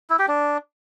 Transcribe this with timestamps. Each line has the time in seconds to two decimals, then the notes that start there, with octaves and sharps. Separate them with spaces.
0.10 E4
0.19 G4
0.28 D4